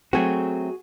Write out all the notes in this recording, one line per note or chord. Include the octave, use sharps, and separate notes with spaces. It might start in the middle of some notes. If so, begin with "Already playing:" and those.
F#3 A3 C4 F#4 G#4